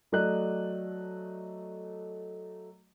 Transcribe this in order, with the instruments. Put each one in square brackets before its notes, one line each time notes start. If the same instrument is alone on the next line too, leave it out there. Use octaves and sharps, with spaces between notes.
[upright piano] F#3 A3 D5 D#5 F#6